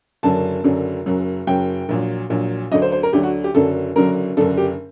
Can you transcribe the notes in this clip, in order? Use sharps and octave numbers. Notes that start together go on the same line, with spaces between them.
F#1 F#2 D3 F#3 A5
F#1 F#2 D3 F#3
F#1 F#2 F#3
F#1 F#2 F#3 G5
A#1 A#2 F#3
A#1 A#2 F#3
D2 D3 F#3 D#5
C5
C5
A#4
D2 D3 F#3 G4
F#4
G4
F#1 F#2 D3 F#3 A4
F#1 F#2 D3 F#3 A#4
F#1 F#2 D3 A4
G4